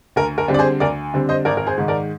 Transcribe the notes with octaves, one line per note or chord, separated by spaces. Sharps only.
D2 A#4
A#4
D3 G3 C4
D5
G#4 C5
D2 A#4 D5
D3 G3 C4
C5 D#5
G#1 A#4 D5
A#4
G#4 C5
G#2 D#3 G#3
A#4 D5